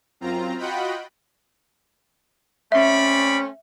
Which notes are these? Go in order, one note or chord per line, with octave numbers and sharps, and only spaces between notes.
F#2 C4 F4 A#5
F4 F#4 D#5 F#5 G5 B5
A3 C4 C#4 D5 E5 B5